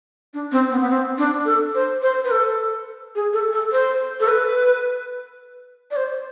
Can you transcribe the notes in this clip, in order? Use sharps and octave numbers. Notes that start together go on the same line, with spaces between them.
D4
C4
B3
B3
C4
D4
A4
C5
C5
B4
A4
G#4
A4
A4
C5
A4
B4
D5
C5